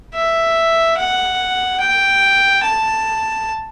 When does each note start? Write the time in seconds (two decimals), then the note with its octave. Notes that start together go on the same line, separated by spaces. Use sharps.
0.14 E5
0.98 F#5
1.80 G5
2.63 A5